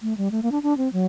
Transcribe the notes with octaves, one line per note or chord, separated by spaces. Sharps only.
A3
G3
A3
A#3
D4
D4
C4
F#3